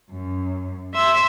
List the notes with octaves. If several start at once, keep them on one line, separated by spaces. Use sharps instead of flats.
F#2
E5 C6 E6